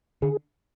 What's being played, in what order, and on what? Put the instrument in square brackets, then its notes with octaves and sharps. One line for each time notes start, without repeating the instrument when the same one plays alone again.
[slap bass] D3 [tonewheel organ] G#4